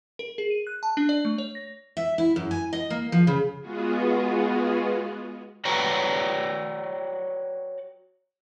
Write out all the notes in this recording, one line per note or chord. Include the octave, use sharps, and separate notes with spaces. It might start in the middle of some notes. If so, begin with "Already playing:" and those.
A#4
G#4
D#7
F#6
A5
D4
D5
A3
C#5
A#6
E5
E4
F#2
G#5
D#5
A#3
F3
C#3
G#3 B3 F4 F#4 G#4
F#4 B4 C#5 D5 G5 A#5